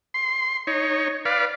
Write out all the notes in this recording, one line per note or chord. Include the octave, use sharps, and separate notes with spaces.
C6
D#4 C#5
B4 D5 F5